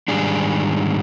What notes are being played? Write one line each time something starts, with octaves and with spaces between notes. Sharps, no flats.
G#2 D#3 G3 D4 G#4